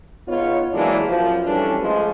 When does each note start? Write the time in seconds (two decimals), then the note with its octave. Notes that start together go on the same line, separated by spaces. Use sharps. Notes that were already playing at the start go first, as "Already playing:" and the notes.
0.28 C#3 B3 D#4 F4 C#5
0.74 C3 E3 F#3 G#3 A#3 D4
1.07 F#2 F3
1.46 E3 G3 C#4 D4 A4 B4
1.82 F3 G#3 A3